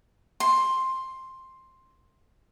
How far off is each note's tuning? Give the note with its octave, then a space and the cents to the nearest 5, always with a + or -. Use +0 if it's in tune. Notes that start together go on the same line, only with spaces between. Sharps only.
C6 +10